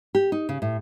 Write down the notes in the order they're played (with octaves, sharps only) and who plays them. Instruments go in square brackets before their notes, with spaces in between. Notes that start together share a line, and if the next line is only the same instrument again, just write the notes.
[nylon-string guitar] G4
D#4
C#3
A2